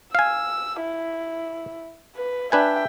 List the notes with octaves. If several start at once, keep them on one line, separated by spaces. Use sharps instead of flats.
F5 G#5 E6
E4
B4
D4 B4 E5 G5 G#5